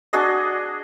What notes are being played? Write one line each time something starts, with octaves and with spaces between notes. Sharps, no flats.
D4 F#4 G#4 D#5